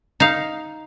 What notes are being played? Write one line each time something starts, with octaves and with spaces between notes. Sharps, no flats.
D#4 F5